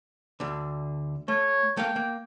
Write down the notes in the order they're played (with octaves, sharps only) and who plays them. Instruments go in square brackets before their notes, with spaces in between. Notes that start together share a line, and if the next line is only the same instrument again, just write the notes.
[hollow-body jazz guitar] D2 D3
[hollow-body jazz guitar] A3 [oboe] C#5
[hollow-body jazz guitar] A3 A#3 F5 [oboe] G5
[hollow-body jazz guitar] A#3